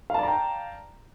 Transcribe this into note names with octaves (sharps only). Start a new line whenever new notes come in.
D5 F5 G5 A5 A#5